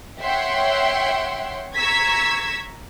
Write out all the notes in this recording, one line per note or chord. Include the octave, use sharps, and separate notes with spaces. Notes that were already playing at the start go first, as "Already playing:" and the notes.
C#5 E5 F#5 G5 C6
A#5 C#6 E6 G#6 B6